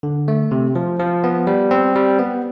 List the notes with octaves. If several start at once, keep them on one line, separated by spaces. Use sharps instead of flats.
D3
A3
C3
F3
F3
B3
G3
C4
G3
B3